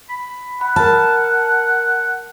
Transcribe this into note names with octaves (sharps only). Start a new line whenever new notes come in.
B5
F#5 B5
A#4 A5 F6